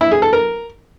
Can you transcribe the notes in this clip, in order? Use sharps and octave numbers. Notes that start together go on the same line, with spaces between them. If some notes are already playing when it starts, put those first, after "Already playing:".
E4
G#4
A4
A#4